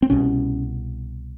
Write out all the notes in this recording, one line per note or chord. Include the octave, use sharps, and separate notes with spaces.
C4
C2 B2 C#4